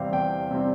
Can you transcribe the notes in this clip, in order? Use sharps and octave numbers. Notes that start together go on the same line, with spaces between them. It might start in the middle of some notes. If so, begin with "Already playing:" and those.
Already playing: E2 C3 G3 C4 F5
E2 G5
C3 G3 C4